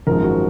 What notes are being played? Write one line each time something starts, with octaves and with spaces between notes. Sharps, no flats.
G#1 F#2 F3 G#3 A#4
F#4